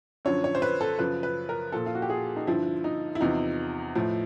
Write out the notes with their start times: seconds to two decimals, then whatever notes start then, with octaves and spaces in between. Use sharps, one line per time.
0.25 F#2 D3 F3 C#5
0.44 C#5
0.55 C5
0.62 B4
0.81 A4
0.99 F#2 C#3 F3 B4
1.23 B4
1.49 A#4
1.72 A#2 F3 A4
1.86 F4
1.95 F#4
2.02 G4
2.10 G#4
2.36 D#4
2.47 G2 D3 F3 E4
2.84 D#4
3.15 E4
3.21 E2 C3 F3 D#4
3.95 A2 F3